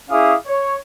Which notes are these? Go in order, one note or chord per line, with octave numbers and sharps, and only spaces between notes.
C#4 E4 G#4 F5 D6 D#6
C#5